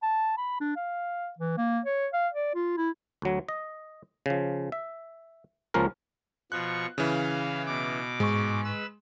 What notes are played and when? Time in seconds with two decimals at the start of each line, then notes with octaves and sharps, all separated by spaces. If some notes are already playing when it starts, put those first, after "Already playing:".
0.02 A5
0.37 B5
0.60 D4
0.76 F5
1.38 E3
1.57 A#3
1.85 C#5
2.14 F5
2.33 D5
2.55 F4
2.77 E4
3.22 D2 F#3
3.49 D#5
4.26 C#3 F3
4.72 E5
5.74 C#2 F3 A#3 C#4 A#4
6.52 B2 F3 C#6 F#6
6.98 C#3 E3 F5
7.67 B2 D6
8.20 G#2 G#3 C#6
8.64 B4 E6